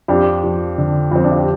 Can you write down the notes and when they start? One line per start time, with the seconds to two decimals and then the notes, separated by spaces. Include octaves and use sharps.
0.08 F2 D4 G4
0.44 F3
0.78 D3
1.11 F2 C4
1.24 D4
1.31 F4
1.38 G4